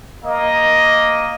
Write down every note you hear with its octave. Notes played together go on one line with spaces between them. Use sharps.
A#3 D#5